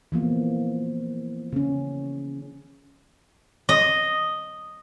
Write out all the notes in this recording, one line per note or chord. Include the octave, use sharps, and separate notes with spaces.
E3 F3 A#3 B3
C#3 C#4
D#5